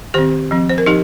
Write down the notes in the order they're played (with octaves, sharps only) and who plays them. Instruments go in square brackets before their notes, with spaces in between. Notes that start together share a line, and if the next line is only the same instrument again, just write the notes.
[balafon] D#3 C4 G4 C5
F3 C4
C5
A#4
F3 D#4 G4